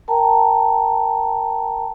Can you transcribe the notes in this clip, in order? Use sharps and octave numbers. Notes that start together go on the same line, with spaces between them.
A#4 G5 A5 A#5